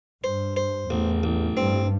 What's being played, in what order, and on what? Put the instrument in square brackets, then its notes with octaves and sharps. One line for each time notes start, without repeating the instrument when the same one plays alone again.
[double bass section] G2 [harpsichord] C5
[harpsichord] C5
[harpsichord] A1 [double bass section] E2
[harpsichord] A1
[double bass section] G2 [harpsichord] C4